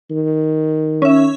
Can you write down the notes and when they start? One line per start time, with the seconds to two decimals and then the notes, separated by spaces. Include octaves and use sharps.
0.10 D#3
1.02 C#4 E5